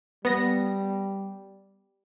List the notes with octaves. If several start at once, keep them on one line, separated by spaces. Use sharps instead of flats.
G3 B3 A#6